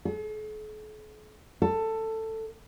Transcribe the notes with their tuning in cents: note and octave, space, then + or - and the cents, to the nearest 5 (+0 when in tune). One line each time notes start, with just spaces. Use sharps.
A4 -45
A4 +15